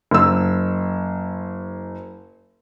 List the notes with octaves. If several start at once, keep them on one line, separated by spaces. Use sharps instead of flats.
F#1 E6